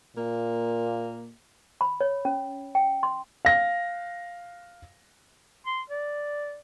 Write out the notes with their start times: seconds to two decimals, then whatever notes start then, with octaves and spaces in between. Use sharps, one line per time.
0.17 A#2 A#3
1.81 B5
2.01 C#5
2.25 C#4
2.75 G5
3.03 C6
3.45 F5 A#6
5.66 C6
5.90 D5